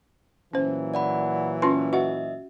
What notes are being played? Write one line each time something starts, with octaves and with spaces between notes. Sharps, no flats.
A#2 E3 F#3 C#4 C5
D5 F#5 B5
C#4 F4 B4 C6
F#4 D#5 E5 F#5